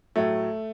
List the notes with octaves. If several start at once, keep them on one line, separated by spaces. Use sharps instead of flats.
A2 F#3 A3